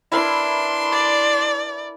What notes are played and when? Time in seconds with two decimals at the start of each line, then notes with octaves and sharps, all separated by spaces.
0.12 D4 E4 A#4 B4 C6
0.92 D5